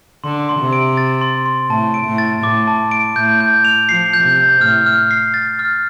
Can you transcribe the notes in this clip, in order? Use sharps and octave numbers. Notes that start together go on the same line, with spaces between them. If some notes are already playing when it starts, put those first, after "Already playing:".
D3 C6
C6
C3
D7
A6
C6
C6
A2 A5
D7
A2
A6
A2 D6
A5
D7
A2 G6
G6
F7
F3 C7
G6
C3
G6
A2 F6
F6
C7
A6
F6